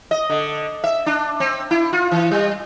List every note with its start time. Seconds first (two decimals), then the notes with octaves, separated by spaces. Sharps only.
0.11 D#5
0.29 D3
0.84 E5
1.06 D4
1.40 C4
1.71 E4
1.93 F4
2.11 E3
2.31 G3